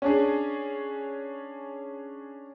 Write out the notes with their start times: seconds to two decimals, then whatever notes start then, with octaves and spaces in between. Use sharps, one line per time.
0.02 C#4 D4 G#4